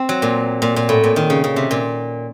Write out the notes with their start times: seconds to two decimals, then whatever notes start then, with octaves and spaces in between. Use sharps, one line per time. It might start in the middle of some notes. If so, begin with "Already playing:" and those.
Already playing: C4
0.09 F#3
0.22 A#2
0.62 A#2
0.76 A#2
0.89 A2
1.04 A#2
1.16 D#3
1.30 C#3
1.44 C#3
1.56 C3
1.71 A#2